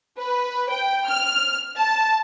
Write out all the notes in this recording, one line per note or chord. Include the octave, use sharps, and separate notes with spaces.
B4
G5
F6
A5